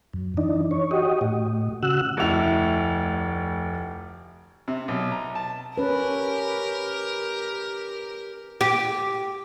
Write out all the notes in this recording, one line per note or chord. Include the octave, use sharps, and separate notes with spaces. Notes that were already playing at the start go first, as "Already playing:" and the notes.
F#2
E3 D4 D#4
C#5
F#4 G4 D#5
A2
C#3 F#4 E6 F#6
F1 D2 E4 F7
C3
B1
A#5
A5
C#4 G4 A#4 B4
G4